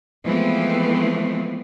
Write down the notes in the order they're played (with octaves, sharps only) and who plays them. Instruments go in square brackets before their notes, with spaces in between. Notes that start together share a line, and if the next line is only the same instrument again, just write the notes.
[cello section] E3 F3 G#3 A3 B3 C4